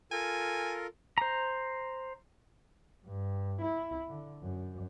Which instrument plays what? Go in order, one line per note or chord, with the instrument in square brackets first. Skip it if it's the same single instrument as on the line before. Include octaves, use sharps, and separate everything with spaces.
[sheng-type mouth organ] F4 A4 A#4 [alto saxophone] G#5
[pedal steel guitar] C5 A#5
[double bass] G2
E4
D3
F#2